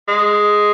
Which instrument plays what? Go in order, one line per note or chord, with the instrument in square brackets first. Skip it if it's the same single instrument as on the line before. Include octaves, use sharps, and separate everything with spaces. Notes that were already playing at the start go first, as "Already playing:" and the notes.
[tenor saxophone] G#3